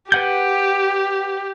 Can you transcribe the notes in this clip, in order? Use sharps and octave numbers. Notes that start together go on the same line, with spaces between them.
G4 B4 F#5 G6